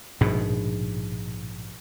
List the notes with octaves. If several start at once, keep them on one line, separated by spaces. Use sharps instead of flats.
A#1 G#2 B2